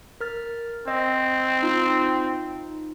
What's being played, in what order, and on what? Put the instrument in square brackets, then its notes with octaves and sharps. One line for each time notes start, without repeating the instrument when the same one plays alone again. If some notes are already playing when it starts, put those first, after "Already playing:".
[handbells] A#4 F6 A6
[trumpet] C4 [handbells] D#5
[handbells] D#4 F4